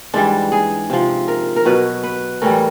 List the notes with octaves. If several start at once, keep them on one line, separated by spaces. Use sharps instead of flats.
G#2 E3 G3 D4
G#4
C3 F3
A#4
A#4
B2 F#3 B4
B4
A2 E3 G3 A#4